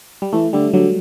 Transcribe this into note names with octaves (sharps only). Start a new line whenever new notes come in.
G3
E3 A3
D3 G3
D3 F#3